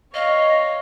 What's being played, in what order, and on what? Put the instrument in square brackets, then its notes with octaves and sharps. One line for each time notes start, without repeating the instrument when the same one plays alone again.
[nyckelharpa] C#5 F5 [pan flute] D#5